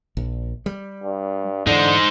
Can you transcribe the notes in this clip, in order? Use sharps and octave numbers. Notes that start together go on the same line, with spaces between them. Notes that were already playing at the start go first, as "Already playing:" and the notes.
A#1
G3
G2
G#2 D3 E3 D#4 C5